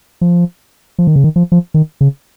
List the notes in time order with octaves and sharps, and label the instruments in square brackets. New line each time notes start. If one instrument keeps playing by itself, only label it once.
[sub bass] F3
F3
D#3
C#3
D#3
F3
F3
D#3
C#3